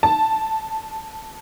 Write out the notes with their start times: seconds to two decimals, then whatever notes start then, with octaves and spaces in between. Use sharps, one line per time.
0.03 A5